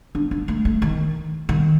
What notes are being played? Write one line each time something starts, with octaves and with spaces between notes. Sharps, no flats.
D4
D4
A3
A3
D#3
D#3